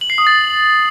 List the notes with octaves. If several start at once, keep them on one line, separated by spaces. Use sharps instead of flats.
F#7
C7
D#6
A6